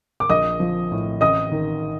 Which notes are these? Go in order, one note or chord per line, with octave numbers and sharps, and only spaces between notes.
D6
A#1 D#5 D#6
F3
A2
A1 D#5 D#6
D#3